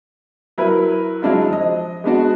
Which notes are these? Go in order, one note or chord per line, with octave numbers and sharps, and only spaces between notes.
F#3 E4 A#4 B4
F#3 G#3 D4 E4 F4
F3 D#5
G#3 B3 D4 F#4